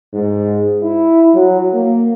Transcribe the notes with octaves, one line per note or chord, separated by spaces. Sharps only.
G#2
E4
F#3
A#3